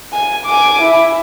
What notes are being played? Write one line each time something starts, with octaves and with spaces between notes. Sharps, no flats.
G#5
G#5 D6
E4